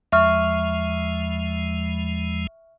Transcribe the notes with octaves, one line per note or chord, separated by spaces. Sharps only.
E2 F3 G#3 E5 C#6 F6